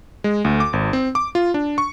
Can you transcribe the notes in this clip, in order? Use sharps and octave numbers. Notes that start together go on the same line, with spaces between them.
G#3
D2
D6
G#1
C4
D6
F4
D4
C#6